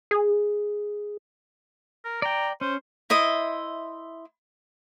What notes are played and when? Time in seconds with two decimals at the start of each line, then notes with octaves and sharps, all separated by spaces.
0.11 G#4
2.04 A#4
2.22 D5 G5 A#5
2.61 C#4 C5
3.10 E4 C5 D#5 E5